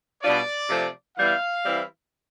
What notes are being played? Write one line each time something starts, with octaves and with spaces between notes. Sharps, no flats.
B2 G3 D4 F4 D5
C3 F3 A3
E3 G3 B3 E4 F5
E3 G3 C4 E4